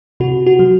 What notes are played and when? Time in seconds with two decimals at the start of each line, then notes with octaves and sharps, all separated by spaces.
0.20 C3 F#4
0.46 F#4
0.59 F#3